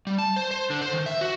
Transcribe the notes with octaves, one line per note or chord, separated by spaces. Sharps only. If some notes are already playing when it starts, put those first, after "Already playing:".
G3
A5
C5
C5
D3
C5
D#3
E5
F#4